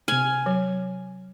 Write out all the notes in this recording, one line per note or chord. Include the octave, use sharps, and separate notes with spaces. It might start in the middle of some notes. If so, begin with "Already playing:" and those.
C3 G#5 F6
F#3